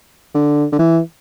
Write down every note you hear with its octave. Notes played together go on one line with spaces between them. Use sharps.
D3
D3
E3